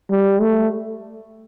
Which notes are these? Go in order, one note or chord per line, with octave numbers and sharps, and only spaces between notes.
G3
A3